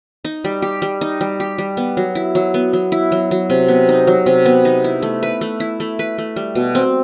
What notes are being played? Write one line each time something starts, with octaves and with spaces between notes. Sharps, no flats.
D#4
G3
G4
G3
D#4
G3
G4
G3
B3
F#3
E4
F#3
B3
F#3
E4
F#3
F#3
C3
B3
D#4
F#3
C3
B3
D#4
E4
A3
B4
A3
E4
A3
B4
A3
G3
B2
C4